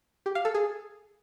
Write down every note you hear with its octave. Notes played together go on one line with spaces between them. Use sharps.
G4
F5
A4
G#4